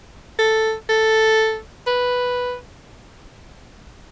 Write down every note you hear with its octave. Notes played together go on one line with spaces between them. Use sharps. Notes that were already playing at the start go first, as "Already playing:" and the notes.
A4
A4
B4